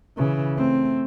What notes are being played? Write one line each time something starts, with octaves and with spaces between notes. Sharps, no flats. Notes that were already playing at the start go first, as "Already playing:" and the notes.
C#3 E3
A3 C4